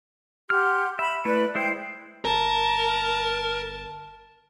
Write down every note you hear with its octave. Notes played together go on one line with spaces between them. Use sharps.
G4 F#5 C6 F6
E5 B5
A3 E4 B4 D5
G#3 E4 C5 G5
G1 A#4 A5